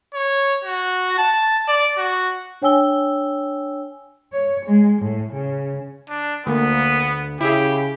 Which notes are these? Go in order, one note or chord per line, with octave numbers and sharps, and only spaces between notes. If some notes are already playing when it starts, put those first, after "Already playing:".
C#5
F#4
A5
D5
F#4
D4 C#5 G5 G#5 E6 G7
C#5
G#3
A2
C#3
D4
D2 A#3 B3
C#3 E4 G4 G#4